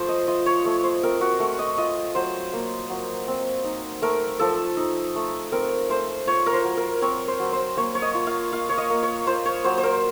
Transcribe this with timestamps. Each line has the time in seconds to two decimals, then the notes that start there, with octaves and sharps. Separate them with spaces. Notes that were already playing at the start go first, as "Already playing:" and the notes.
Already playing: F3 A3 F4 C5
0.09 D#5
0.27 F4 D#5
0.46 C#5
0.65 A3 C#5
0.83 C5
1.03 C4 A#4
1.21 F#4
1.39 A3 F#4
1.59 D#5
1.78 F4 D#5
2.15 F#3 C5
2.53 A#3
2.89 F#3
3.28 C4
3.64 D#4
4.02 A3 A#4
4.39 F3 A4
4.77 D#4
5.16 A3
5.52 C4 A#4
5.89 A3 C5
6.27 F4 C#5
6.46 A#4
6.53 C5
6.64 F#3
6.77 A#4
7.02 C4 C#5
7.28 C5
7.39 F#3
7.53 C5
7.77 A#3 C#5
7.95 C#5
8.02 D#5
8.14 F4
8.27 F5
8.52 F4 F5
8.69 C#5
8.78 D#5
8.90 A#3
9.03 C#5
9.27 F4 C5
9.45 C#5
9.64 F#3 C5
9.78 C5
9.83 A#4